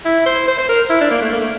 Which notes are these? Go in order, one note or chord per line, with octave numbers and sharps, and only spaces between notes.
E4
C5
C5
C5
A#4
E4
D4
A#3
A3
A#3
A3